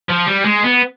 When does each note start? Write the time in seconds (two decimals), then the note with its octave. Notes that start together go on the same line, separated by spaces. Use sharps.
0.10 F3
0.28 G3
0.45 G#3
0.64 B3